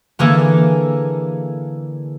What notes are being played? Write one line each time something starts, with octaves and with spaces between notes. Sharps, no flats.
D3 E3 A#3 G#4 A4